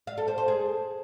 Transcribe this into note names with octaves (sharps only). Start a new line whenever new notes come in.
F5
A4
C5
C5
G#4